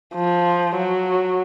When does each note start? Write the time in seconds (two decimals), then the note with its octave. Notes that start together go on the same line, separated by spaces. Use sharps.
0.15 F3
0.76 F#3